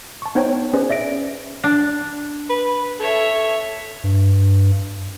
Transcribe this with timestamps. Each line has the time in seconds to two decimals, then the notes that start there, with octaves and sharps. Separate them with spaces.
0.22 A5 C#6
0.35 B3 D#4 C5 C#5 G5
0.49 C#5
0.73 C#4 G#4 B4 C5 D5
0.89 D5 E5 A#6 D7
1.64 D4
2.50 B4
3.00 A4 C#5 E5
4.04 G2